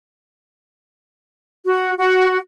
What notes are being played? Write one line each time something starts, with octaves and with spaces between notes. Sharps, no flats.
F#4
F#4